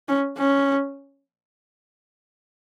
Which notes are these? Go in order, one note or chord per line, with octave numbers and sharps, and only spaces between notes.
C#4
C#4